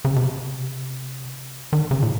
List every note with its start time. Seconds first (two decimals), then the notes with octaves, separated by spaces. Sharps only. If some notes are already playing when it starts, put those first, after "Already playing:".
0.05 C#3
0.16 C3
1.73 D#3
1.91 C#3
2.02 A#2